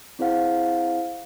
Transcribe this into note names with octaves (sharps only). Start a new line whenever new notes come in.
C4 E4 G#4 C5 F5 F#5